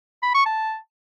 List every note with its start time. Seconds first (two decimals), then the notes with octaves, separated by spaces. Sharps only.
0.23 B5
0.34 C#6
0.46 A5